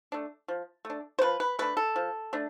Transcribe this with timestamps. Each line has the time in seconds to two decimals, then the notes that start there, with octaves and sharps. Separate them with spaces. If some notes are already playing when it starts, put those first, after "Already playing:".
0.12 A3 D4
0.48 F3
0.85 A3
0.90 D4
1.19 C5
1.22 F3 B4
1.40 B4
1.59 A3 D4 B4
1.77 A4
1.96 F3
2.33 A3 D4